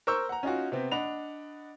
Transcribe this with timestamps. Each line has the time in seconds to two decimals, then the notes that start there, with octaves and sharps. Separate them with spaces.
0.07 A#4 C5 C#6 E6 G6
0.29 F#5 A#5
0.43 C#4 D#4 F4 F#4
0.72 C3 B3 C4
0.91 D4 D#5 F#5 B5 F7